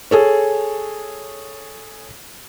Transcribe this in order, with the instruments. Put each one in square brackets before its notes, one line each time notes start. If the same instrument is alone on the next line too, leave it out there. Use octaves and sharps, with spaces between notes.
[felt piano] G#4 A4 C#5